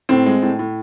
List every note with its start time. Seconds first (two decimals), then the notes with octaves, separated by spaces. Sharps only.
0.09 A2 C4
0.26 G#3
0.43 A2
0.59 A2